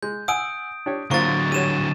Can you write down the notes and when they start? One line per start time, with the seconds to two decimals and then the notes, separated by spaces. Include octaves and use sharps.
0.03 G#3 G6
0.28 F#5 G#5 D#6 E6 D7
0.86 D4 G4 C#5
1.11 D3 F#3 A#3 C4 F4 C#6 A6
1.52 G3 C#5 D#7 E7